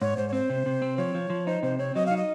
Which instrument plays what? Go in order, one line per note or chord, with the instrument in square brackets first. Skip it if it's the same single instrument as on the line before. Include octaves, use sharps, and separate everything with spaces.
[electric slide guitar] G#2 [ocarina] C#5
[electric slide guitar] G#2 [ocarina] C5
[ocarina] C#5
[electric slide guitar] C4 [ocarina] C5
[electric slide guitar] C3
C3
C4
[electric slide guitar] F3 [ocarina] C#5
[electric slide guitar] F3
F3
[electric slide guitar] D#4 [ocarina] C5
[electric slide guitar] C3 [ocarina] C5
[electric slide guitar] C4 [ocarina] C#5
[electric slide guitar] F#3 [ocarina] D#5
[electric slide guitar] D#4 [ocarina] F5
[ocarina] D#5